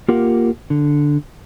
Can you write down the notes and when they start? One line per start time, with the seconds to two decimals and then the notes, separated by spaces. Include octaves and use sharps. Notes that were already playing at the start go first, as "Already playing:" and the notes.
0.08 A#3 F4 G4 A#4 F#5
0.70 D3